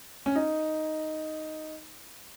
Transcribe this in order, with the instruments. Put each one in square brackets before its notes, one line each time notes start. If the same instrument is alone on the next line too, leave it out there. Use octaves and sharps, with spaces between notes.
[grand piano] C#4
D#4